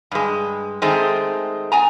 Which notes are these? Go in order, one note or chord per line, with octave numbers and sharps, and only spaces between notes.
G2 G#3
D#3 G#3 A3 C4
B3 G#5 A#5